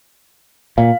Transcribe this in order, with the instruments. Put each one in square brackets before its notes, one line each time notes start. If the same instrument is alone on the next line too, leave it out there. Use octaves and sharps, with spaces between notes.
[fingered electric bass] A#2 [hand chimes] F5